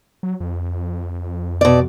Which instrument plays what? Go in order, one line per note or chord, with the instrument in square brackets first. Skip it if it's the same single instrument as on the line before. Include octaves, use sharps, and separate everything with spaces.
[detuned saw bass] F#3
F2
[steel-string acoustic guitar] B2 D5